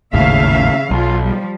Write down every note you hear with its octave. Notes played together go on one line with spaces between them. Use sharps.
G#1 D#2 A2 C#3 E5 F5
B1 F#3 F4
F3 G3